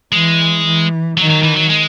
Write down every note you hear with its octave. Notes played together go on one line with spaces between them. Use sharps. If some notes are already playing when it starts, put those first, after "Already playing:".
E3 G#3
E3
D#3 F#3
F#3
E3
F#3
G#3